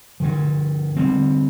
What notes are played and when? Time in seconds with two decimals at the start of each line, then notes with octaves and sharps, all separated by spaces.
0.20 G2 D3 F3
0.97 D3 G3 C4